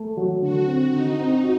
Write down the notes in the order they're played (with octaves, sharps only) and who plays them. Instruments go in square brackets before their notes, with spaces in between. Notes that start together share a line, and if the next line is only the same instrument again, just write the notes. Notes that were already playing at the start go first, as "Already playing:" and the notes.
Already playing: [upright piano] A3
F#3
[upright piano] D3 [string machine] F#4
[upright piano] C4
[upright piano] D3 [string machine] D#4
[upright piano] C4
F#4